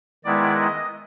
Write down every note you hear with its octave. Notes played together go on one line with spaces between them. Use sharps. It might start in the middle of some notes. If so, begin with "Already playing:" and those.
D#3 G#3 B3 E4 D5
D#5